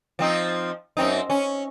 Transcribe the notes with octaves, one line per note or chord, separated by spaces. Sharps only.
F3 C4 D#4
F#2 C4 D#4
C#4